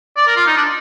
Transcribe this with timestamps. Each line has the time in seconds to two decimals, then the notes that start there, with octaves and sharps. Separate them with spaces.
0.16 D5
0.27 A#4
0.36 F4
0.47 D#4
0.57 D4